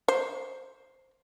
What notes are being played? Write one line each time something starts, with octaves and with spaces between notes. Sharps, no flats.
C5